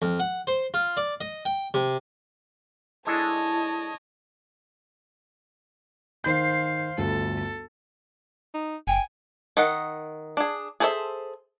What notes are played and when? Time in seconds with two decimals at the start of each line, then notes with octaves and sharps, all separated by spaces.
0.02 F2
0.20 F#5
0.47 C5
0.74 F4
0.97 D5
1.21 D#5
1.45 G5
1.74 C3
3.07 G#3 D4 E4 A4 C#5 D#5 A5
6.24 D#3 C5 F5 G6
6.98 G1 D2 A4
8.54 D#4
8.87 F#1 G5 G#5
9.57 D#3 D#5 F#5
10.37 D4 G#4
10.80 G#4 A4 C5 C#5 E5